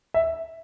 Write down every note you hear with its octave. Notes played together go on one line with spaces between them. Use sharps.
E5